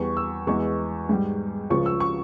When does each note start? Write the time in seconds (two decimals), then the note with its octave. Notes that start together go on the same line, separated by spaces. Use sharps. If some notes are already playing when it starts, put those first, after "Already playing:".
Already playing: E2 E3 G3 C#6
0.17 E6
0.47 E2 E3 G#3 C#6
1.09 G#2 G3
1.70 C#2 C#3 F3 C#6
1.86 E6
2.00 C#6